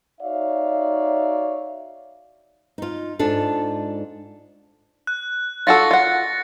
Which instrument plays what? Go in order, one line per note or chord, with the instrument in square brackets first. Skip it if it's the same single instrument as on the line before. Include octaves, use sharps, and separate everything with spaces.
[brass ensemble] D#4 F#4 C#5 D5 E5 F5
[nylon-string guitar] D#4 F4
G#2 D4 F4 A4
[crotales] F#6
[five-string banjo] F4 F#4 A4 [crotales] A6 A#6 C#7
[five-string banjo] F4 F#5